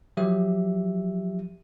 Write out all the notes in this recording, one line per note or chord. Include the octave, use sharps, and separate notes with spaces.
F3 F#3 G4 E5